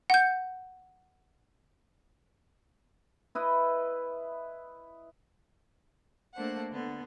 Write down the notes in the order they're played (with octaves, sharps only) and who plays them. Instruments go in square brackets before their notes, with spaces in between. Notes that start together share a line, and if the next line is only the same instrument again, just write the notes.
[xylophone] F#5 G6
[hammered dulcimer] E4 B4 D#5
[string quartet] A3 A#3 D4 C5 F#5
D3 B3